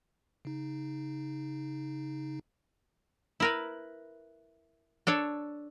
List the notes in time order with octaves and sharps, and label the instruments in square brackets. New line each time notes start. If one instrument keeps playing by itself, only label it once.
[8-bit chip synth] C#3 D#4
[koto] E4 A#4 B4
D4 A4 C#5